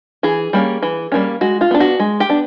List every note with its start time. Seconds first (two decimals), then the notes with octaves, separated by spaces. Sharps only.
0.23 E3 G#4
0.53 G3 A#3 C#4
0.83 E3
1.12 G3 A#3 C#4
1.41 G#3 F#4
1.61 F4
1.71 B3 D4
1.80 F#4
2.00 G#3
2.20 G4
2.30 B3 D4